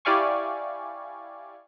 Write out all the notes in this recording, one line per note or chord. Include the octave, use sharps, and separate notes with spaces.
E4 G4 D5 F5 G#5 C#6